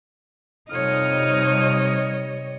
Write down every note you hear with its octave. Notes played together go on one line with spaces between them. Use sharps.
F2 C3 G3 D#4 C#5 D#5 D#6 F6